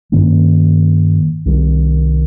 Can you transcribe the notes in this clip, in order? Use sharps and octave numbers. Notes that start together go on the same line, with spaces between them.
G2 D#3 A#3 C#4
C2 C3 D#3 G3